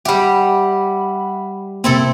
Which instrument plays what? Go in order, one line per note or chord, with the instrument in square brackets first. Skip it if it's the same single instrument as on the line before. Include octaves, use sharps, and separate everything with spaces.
[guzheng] G3 G4 [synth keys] E5 F#5 B5
[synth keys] C3 A#3 [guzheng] C4 E4 A4